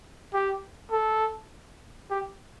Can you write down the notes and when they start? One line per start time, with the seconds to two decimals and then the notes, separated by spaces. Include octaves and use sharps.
0.34 G4
0.92 A4
2.10 G4